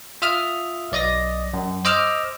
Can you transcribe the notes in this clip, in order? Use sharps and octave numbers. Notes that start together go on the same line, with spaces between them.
F4 E5 D#6 F6
B1 D5 D#5 D#6 A#6
F#2
C5 D#5 D6 E6 F6